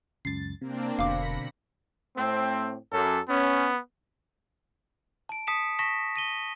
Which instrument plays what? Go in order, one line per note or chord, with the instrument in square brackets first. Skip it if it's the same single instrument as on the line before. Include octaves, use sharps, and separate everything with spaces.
[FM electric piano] C#2 F#2 A6 [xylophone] C7
[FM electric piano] C3 [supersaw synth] A#3 C4 D4
[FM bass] F1 [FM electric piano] B2 D3 [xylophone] F5 D6 [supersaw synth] B5 A#6 C#7
[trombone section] A2 A3 C4
[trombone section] F#2 [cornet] A4
[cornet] B3 [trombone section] C#4
[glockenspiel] A5 D7
A5 D#6 B6 C#7 E7
A5 C#6 A#6 B6 E7
A#6 D#7 G7